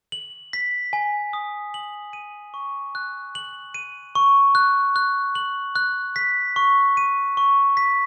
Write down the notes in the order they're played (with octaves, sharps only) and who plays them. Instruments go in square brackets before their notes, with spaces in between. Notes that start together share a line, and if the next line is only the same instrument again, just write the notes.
[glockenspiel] F#7
B6
G#5
D#6
F#7
D#7
C#6
F#6
F#7
D#7
C#6
F#6
F#6
F#7
F#6
B6
C#6
D#7
C#6
B6